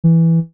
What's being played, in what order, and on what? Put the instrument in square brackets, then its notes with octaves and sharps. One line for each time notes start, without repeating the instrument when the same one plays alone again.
[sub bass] E3